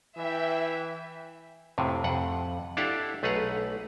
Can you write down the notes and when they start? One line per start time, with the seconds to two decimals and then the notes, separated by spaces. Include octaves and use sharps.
0.17 E3 E5 G5
1.78 F2 A2 C3
2.04 F2 F#5
2.77 D4 E4 G4 A4 F5 F#5
3.23 B1 A3 G#4 B4 F#5 A#5